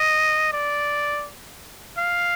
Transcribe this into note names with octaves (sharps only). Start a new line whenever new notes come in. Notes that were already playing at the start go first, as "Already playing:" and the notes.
Already playing: D#5
D5
F5